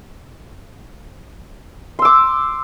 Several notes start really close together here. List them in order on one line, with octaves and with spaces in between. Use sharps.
C6 E6 D6